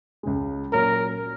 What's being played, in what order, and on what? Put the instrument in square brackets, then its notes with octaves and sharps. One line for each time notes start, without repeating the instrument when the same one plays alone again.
[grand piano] C#2 C#3 G#3
[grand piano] A#2 F#3 A#3 C#4 [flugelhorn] A#4